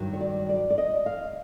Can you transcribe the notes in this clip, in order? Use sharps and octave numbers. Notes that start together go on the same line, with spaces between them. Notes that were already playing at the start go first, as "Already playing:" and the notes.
Already playing: G2 D#3 F#3
C#5
D5
D5
D5
D#5
F5